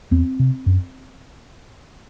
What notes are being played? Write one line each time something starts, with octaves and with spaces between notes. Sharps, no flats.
E2 C4
C3
F#2